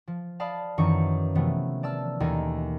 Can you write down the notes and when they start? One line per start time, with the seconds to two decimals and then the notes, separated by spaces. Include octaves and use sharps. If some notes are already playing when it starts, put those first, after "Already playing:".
0.07 F3
0.40 D5 F5 A5 B5 D#6
0.78 F#2 D#3 E3 C#6 D6 C#7
1.35 C3 E3 F3 A3 B3
1.83 D5 A5 E6 F6
2.20 D#2 B2 E3 A4 A#4 G#5